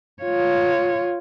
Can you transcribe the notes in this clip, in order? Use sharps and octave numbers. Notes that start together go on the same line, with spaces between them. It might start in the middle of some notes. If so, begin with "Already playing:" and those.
F4 C#5